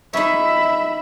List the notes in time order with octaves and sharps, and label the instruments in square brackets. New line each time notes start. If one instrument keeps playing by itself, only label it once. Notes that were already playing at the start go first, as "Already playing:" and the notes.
[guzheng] D#4 C#5 [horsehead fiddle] E5 B5